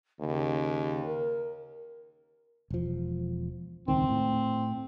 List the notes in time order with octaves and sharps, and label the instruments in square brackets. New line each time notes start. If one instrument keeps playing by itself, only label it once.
[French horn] D#2 [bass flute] C#3
[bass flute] A#4
[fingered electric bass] E1 F3
[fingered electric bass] D#1 C#2 D#3 [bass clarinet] C4
[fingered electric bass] A2